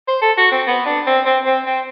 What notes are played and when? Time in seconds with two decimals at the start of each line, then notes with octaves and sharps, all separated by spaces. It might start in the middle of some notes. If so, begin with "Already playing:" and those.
0.08 C5
0.22 A4
0.38 F#4
0.51 C4
0.67 B3
0.86 D4
1.06 C4
1.26 C4
1.45 C4
1.66 C4